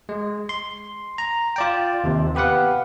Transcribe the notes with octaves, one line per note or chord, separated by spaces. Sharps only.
G#3
C6
A#5
F4 D5 G5
D#2 C3
B3 G4 B4 F5 F#5